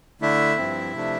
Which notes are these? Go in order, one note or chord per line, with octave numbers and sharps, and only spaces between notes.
D3 A3 D4 E4 E5
G2 F3 C4
C3 F3 A3 D4